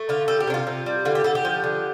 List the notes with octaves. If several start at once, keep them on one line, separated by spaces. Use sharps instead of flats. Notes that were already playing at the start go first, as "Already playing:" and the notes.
Already playing: A3
D3 F4
G3 A4
G4
C3 D4
F4
C3
G3
D3 F4
G4
D3 A4
G4
F3
D3